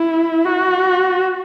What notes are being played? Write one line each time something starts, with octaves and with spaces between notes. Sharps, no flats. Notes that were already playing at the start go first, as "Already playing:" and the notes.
Already playing: E4
F#4